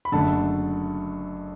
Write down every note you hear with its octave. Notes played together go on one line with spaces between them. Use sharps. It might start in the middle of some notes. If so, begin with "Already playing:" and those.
B5
F#1 F#2 D3 A3 A5